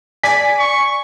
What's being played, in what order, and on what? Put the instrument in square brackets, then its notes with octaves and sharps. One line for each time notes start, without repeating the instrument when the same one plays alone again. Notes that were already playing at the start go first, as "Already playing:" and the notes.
[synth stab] D5 G#5 [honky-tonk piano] B6
[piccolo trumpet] C#6